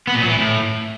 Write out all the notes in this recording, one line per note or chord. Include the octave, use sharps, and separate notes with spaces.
B3
A#2
F#3
E3
A2